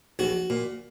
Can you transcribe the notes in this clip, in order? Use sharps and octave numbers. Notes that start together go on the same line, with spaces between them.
A#1 F#4
A#2